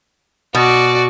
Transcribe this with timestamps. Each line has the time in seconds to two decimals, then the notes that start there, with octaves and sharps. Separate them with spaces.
0.55 B2 F#4 D5